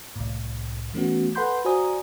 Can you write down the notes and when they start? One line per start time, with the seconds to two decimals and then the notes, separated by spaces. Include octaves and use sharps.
0.16 C2 A2
0.94 E3 A3 B3 C#4 F#4
1.35 A4 B4 F#5 B5 C6 G6
1.65 F#4 C5 D5 G#5 A#5 D#6